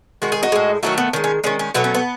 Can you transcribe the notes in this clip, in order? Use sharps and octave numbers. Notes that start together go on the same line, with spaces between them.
D#3 G#3 F#4
G#4
D#4 F#4
A2 G#3
D#3 F#3 A3 D#4 F#4
B3
D#3 G#3 C#4
C#4
D#3 G#3 C#4
C#4
B2 F#3 A3 B3
C#4
B3